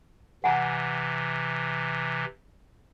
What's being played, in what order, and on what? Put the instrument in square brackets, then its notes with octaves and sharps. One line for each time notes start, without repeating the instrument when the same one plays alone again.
[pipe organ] C3 E3 [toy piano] F#5 G#5 A#5